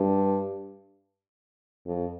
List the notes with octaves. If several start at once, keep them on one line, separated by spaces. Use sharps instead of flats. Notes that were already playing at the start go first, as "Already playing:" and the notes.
Already playing: G2
F2